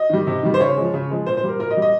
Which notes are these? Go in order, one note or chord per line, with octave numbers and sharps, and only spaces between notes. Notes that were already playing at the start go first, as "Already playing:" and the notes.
Already playing: D#5
D#3 G3
C3
D#3 G3
C5
C#3 C#5
F3 G#3
C#3
F3 G#3
A#2 C5
C5
G3 A#4
A#2 A#4
D#5
G3
D#5